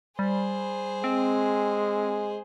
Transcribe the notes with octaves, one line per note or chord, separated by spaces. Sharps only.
G3 G#4 C5
G#3 C4